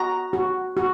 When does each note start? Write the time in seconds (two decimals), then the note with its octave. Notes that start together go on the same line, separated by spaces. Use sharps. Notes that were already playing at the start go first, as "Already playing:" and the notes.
Already playing: F#4 A#5
0.33 F#4
0.77 F#4